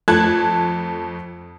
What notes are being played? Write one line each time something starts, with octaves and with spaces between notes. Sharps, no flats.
F2 A3 A5 F#6 G#6